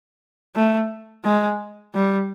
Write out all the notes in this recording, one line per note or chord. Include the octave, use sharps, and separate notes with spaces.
A3
G#3
G3